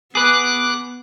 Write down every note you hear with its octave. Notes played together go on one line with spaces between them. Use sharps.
B3 G#4 B4 D6 F#6